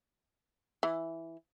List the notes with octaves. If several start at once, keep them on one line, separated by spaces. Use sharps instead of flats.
E3